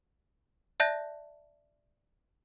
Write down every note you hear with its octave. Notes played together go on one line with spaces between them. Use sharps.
D5 E5 A5 F#6 G6 A#6